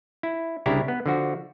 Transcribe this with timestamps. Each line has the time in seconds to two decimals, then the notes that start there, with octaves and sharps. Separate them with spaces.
0.23 E4
0.66 C2 C#3 D4 E4 G4 A#5
0.88 B3
1.06 D3 F3 F#4